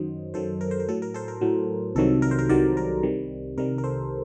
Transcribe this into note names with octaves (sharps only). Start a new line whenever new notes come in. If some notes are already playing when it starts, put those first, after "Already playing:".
Already playing: F#2 D#3 F#3 C5 D#5
F#2 D#3 F#3 A4 C5
A#4
C5
A#4
A2 F#3 A4
A#4
A4 C5
A#4
A2 F#3
C2 C3 D#3 F#3 A4
A#4
C5
A#4
C2 C3 D#3 F#3 A#4 D5
A#4
C2 C3 D#3 G3
C2 C3 D#3 G3 A#4
A#4
A4 C5